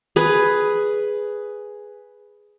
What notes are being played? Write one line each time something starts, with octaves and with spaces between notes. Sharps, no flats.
G#4 B4